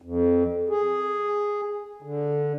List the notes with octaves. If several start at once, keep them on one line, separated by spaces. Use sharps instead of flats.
F2
G#4
D3